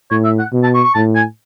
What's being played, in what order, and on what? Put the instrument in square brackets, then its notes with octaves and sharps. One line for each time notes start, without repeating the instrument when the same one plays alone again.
[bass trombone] A2 [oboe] C#5
[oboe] E5
F#5
[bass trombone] B2
[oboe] A5
C#6
C#6
[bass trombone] A2 [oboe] A5
[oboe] G#5